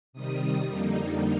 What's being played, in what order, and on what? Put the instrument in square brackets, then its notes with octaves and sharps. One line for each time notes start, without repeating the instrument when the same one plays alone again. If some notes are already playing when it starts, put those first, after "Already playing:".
[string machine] C3 D#3 G3 D#6
F2 D3 G3 A#3 D#4